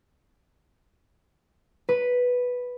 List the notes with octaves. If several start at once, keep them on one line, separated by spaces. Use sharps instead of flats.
B4